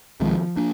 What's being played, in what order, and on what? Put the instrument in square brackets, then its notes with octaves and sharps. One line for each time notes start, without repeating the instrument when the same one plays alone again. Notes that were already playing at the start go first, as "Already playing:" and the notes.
[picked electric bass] C2 C3 D#3 G#3 [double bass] F3
[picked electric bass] A#3 D4